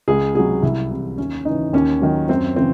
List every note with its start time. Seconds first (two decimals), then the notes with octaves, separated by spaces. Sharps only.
0.08 C#2 G#4
0.35 C3 F#3 G#4
0.62 C2 E4
0.91 C3 E3
1.18 D#2 C#4
1.45 C#3 E3 D#4
1.73 D#2 C#4
2.02 D#3 F#3
2.29 F#2 C4
2.56 C#3 E3 C4